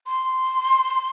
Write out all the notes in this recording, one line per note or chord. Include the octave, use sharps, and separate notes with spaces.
C6